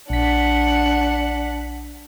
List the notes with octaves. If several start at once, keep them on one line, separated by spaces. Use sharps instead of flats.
A#1 D4 F#5 B6